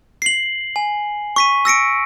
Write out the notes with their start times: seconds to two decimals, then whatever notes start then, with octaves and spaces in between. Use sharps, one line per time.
0.22 C7 F#7
0.76 G#5
1.36 C#6 B6 D#7
1.65 E6 A#6 C#7 D7